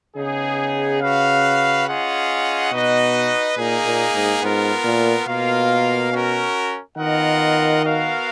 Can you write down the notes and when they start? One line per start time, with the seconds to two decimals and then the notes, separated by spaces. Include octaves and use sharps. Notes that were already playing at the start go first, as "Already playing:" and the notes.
0.17 C#3 B3 D#4 G#4
1.01 F#4 B4 F5
1.87 C#4 F4 G#4 D#5 F#5
2.72 B2 D#4 F#4 B4 D#5
3.57 A#2 A#3 D#4 G#4
3.85 A#2
4.14 G#2
4.42 G#2 B3 F4 A#4
4.84 A#2
5.27 B2 A#3 F4 A#4 F5
6.12 C#4 F#4 A#4
6.97 D#3 B3 F4 A#4 D#5 F#5
7.82 B3 F#4 A#4 F5